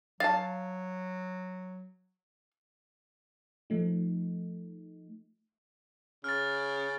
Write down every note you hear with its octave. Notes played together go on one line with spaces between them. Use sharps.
F#3 F5 A5 A6
F3 A3 D#4
C#3 F6 A6